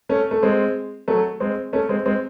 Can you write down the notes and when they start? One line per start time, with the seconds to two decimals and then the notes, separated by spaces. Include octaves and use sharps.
0.09 A3 C#4
0.31 A3
0.43 G#3 C4
1.08 F#3 A3
1.40 G#3 C4
1.73 A3 C#4
1.89 G#3 C4
2.06 G#3 C4